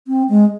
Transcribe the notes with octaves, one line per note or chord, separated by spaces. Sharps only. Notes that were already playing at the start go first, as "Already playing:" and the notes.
C4
G#3